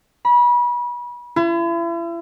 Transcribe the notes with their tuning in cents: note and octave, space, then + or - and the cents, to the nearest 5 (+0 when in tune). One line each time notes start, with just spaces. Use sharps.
B5 -30
E4 +40